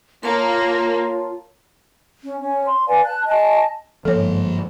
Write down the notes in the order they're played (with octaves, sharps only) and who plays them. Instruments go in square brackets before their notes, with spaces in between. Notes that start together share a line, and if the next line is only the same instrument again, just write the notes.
[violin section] A#3 [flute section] F4 [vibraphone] C#5 A5 C6
[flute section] C#4
C#4 C#5
C6
B4 D5 F5 G#5
A5 F#6
D#5 G#5 A5
[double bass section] G1 G#2 [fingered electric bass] F3 A#3 [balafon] A4 C#5